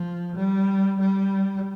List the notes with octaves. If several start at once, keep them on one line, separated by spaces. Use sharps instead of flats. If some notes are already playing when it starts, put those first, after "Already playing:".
Already playing: F3
G3
G3